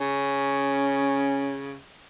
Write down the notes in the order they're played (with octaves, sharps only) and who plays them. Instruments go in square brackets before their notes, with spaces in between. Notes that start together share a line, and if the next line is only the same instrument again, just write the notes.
[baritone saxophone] C#3 [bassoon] C#4